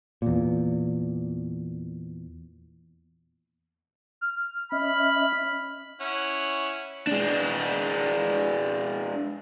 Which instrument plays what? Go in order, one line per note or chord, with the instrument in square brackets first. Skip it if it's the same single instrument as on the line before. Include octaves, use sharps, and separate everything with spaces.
[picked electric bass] E2 A#2
[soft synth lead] F6
[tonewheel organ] C#4 D#5 E5 [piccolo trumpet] B5
[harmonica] C#4 E4 F#5
[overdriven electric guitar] G#3 D4